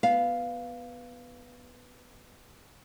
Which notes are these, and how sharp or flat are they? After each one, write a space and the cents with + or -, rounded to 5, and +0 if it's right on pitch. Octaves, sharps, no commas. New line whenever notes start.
B3 +0 F5 +0